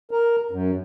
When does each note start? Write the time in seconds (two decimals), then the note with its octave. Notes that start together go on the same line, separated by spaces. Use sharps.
0.11 A#4
0.51 F#2